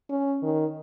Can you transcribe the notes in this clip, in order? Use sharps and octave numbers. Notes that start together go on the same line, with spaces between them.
C#4
D#3